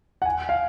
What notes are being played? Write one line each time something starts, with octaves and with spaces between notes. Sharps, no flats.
F#5
G#5
F5